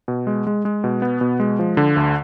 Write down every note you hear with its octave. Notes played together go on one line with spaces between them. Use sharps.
B2
G#3
G#3
G#3
B2
B3
B2
G#3
F3
D3
D2